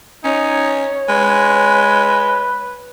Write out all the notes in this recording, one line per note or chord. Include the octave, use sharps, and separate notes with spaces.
C#4 D#4 C#5
G#3 B4